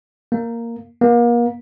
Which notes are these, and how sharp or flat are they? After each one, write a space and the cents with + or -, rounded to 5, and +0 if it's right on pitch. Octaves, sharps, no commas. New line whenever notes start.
A#3 -5
A#3 +35